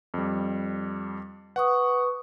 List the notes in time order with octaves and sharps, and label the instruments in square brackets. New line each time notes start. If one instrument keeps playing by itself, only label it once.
[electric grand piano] F2 G3
[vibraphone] B4 C#6 D#6 [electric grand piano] F#5